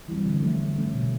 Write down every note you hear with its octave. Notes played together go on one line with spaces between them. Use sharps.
E3 G3 C4
D3
F3 A3 C#4
D3
F3 A3 C#4
B2